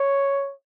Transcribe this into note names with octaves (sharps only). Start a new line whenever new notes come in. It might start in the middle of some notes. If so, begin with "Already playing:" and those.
Already playing: C#5